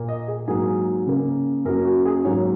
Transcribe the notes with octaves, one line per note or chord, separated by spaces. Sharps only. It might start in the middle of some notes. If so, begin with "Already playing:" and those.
Already playing: A#2 A#3
D#5
G#4
G#2 F#3 A#3 G#4
C#3 A#3
F#2 F#3 A#3 A#4
F#4
G#4
G#2 F#3 A#3 C#5